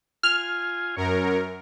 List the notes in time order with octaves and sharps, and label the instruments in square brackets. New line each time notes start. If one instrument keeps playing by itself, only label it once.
[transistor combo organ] F4 G#5 [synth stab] F6
[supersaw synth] F#2 A#4 [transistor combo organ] C#5